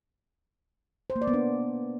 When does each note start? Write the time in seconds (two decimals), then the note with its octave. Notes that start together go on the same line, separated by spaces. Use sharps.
1.10 C5
1.16 A#3
1.22 D5
1.28 B3
1.33 D4